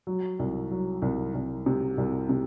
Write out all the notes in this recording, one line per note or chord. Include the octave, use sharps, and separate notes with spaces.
F#3
C2
F#3
C2
C2
C3
C2
C3